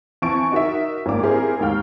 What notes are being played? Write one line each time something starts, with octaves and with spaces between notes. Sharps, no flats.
E3 C4 A5 C#6 A6 D7
D#4 F#4 A#4 D#5 E5
G#1 A#3 C#4 D4 F5 D6
C4 E4 G4 G#4 A#4 C5
D#2 G#2 F5 G5 F6